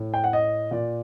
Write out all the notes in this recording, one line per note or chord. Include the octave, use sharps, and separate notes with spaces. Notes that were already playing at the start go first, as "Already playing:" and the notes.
Already playing: A2
G5
F#5
D#5
A#2 D5